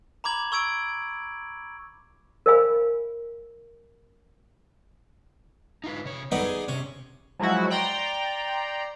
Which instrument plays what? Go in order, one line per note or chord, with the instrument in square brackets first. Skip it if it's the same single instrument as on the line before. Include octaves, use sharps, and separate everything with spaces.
[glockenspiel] A#5 B5 D6 G#6 F#7
C#6 E6 G#6 D7
[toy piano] A#4 C5 D#5 F5 G#5 B5
[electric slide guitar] D#4 F4 B4
C3 C#5
[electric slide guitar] G3 A4 [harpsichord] B3 D4 D#4
[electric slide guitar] G#4
[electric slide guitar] C3 [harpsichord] C#4
[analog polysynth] F3 F#3 G#3 E4 F#4
D5 G5 A#5 C6